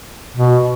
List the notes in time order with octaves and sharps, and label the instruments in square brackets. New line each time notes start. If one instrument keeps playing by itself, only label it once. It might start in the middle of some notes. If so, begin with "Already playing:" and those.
[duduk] B2